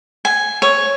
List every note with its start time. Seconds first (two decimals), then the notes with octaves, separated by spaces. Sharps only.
0.25 G#5
0.62 C#5